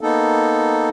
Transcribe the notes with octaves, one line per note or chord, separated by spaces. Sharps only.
A#3 B3 D#4 A4